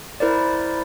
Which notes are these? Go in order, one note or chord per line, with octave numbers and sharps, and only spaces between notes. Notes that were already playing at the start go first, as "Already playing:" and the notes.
E4 A#4 C5 D5